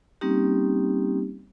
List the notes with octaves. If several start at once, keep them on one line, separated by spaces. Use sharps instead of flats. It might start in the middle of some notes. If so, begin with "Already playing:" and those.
G3 A#3 C4 C#4 D#4 G4